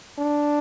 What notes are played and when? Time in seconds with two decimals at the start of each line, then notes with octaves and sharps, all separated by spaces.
0.18 D4